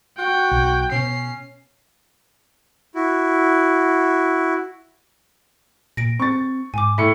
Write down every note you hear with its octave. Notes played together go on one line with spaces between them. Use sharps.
F#4 G5
B1
B2 C#4 C7
E4 F#4
A#2 A#6 D7
C4 C#6 A6
G#2 G#5 D6
A2 E5 C#7